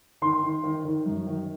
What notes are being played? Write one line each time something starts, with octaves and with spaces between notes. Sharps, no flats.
D#3 C6
D#3
D#3
D#3
F#2
D#3